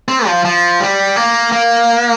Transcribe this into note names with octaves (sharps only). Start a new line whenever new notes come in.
C4
F3
F3
G3
A#3
A#3